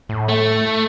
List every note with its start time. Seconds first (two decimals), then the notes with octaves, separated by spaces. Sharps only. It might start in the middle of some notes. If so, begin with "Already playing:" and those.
0.09 A2
0.29 A3